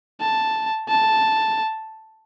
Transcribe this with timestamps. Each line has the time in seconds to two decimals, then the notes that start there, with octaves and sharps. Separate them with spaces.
0.21 A5
0.89 A5